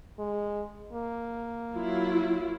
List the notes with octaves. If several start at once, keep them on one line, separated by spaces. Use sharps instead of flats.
G#3
A#3
F#3 E4 F4